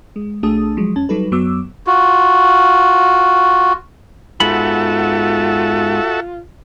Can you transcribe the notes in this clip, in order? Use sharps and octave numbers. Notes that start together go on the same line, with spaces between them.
G#3
B1 A3 D4 G#4 A5 D#6
F3 F#3 G#3
E2 C#4 A5
F#3 G3 D#4 A4 B4
F#2 F#3 B3 D6 E6
F4 F#4
G#2 B3 F4 F#4 A4 E5 B5